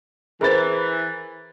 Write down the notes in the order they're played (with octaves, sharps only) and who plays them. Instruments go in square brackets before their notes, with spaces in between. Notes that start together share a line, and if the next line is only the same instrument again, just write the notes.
[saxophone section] E3 [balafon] G#4 C5 [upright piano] A#4 B5 A6